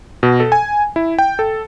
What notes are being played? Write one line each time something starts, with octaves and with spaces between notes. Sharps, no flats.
B2
A4
G#5
E4
G5
A4